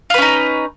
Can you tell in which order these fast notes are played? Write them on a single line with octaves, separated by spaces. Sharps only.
F4 B4 C#4 D#4